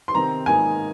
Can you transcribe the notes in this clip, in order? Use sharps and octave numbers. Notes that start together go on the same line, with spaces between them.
C6
C3 D#3 C4 A#5
G#2 D#3 A#3 D#4 G#5